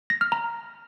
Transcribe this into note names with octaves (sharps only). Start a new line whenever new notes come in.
A#6
F6
A#5